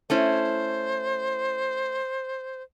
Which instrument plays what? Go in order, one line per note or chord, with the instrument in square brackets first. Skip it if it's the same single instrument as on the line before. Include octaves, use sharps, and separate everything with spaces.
[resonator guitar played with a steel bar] A3 C#4 E4 [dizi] C5